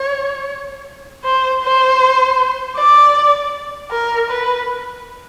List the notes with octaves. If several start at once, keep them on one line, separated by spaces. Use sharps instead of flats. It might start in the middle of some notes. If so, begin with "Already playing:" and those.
Already playing: C#5
C5
C5
D5
A#4
B4